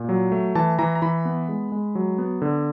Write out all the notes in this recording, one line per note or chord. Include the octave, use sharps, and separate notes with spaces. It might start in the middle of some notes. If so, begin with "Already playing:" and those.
Already playing: A#2
F#3
A3
E3 A5
E3 A#5
A#5
E3 B5
B3
G#3
G#3
F#3
B3
D3